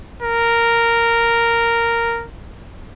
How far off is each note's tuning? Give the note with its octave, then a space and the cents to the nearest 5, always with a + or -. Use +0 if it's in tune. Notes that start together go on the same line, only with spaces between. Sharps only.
A#4 -5